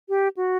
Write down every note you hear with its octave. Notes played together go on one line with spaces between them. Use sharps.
G4
F#4